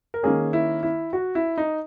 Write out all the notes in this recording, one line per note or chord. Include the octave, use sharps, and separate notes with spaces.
A#4
D#3 A#3 C#4 G#4
E4
E4
F#4
E4
D#4